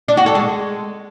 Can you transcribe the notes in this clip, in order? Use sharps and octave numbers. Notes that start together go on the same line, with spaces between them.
D4
F#4
A4
G#3